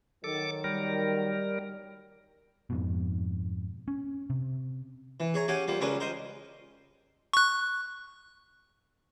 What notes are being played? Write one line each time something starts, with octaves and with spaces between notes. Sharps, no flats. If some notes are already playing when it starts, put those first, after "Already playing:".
D#3 F#3 A4 D6
G3 A#4
F2 G#2 B2
C#4
C3
E3
G#4 C#5 A#5
C#4 F#4 G4 F5 G#5
F3 G3 A#3
C#2 C#4 D4 A#4 B4
A#4 C5 D#5
C#6 F#6